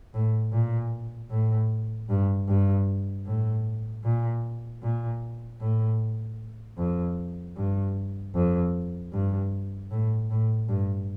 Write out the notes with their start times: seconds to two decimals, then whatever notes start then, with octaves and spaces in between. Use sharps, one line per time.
0.14 A2
0.53 A#2
1.30 A2
2.09 G2
2.48 G2
3.26 A2
4.04 A#2
4.83 A#2
5.61 A2
6.78 F2
7.57 G2
8.35 F2
9.13 G2
9.91 A2
10.30 A2
10.69 G2